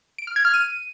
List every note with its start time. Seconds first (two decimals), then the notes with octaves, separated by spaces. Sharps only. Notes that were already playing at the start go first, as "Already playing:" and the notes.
0.18 D7
0.27 F6
0.36 G#6
0.45 F6
0.54 D#7